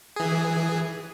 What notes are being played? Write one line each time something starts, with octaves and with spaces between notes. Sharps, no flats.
E3 G#4